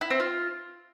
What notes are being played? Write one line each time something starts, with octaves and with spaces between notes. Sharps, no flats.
E4
C4
F4